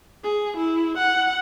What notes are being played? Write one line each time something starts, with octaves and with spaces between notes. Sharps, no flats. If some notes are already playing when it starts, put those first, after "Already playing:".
G#4
E4
F#5